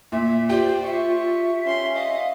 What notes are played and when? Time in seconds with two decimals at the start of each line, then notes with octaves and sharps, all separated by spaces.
0.12 A#2 E5
0.50 F4 G4 C5 D5 G5
0.86 E5 C#6
1.66 C#4 C6
1.96 D#5 F5